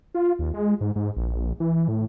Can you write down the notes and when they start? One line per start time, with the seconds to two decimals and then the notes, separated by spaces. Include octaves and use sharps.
0.14 F4
0.39 D#2
0.54 G#3
0.81 G#2
0.96 G#2
1.16 A#1
1.60 E3
1.88 A2